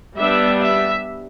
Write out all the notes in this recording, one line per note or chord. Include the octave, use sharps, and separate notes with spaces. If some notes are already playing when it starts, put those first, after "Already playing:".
G3 B3 D4 E5
E5